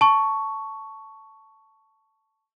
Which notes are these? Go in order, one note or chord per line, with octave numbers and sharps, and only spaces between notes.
A5 C#6